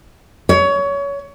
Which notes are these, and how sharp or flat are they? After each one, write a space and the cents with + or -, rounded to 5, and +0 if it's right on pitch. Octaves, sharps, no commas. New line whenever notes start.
C#5 +25